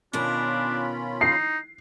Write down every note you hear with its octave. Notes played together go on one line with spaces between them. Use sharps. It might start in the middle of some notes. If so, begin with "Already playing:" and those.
B2 D#3 C#4 D4 F4 A#4 B5
D#4 C7